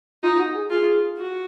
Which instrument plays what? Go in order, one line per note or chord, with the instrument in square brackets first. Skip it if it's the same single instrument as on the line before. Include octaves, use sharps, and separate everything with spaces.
[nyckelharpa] D#4 [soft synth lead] F4
[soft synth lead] F#4
G#4
[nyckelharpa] F4 [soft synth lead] G#4
[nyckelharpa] F#4